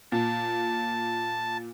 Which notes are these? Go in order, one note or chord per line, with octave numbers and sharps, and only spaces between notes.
A#2 A5